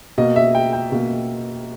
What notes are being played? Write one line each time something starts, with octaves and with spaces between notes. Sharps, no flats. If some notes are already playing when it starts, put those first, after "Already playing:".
B2 A#3 D#5
E5
G5
G5
B2 A#3